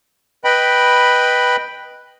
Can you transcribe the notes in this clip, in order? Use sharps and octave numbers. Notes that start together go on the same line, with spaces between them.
B4 D#5 G5 B5